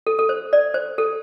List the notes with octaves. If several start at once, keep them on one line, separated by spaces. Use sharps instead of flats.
A4
A4
C5
D5
C5
A4